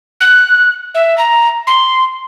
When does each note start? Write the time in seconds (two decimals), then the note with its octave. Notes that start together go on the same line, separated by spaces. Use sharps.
0.20 F#6
0.94 E5
1.18 A#5
1.67 C6